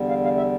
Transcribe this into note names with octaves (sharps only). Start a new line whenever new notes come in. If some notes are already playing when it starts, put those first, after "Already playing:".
Already playing: E2 D3 G3
F5
F5
E5